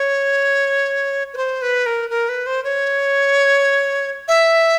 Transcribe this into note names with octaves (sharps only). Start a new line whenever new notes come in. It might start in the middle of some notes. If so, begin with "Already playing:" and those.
Already playing: C#5
B4
C5
B4
A#4
A#4
B4
C5
C#5
E5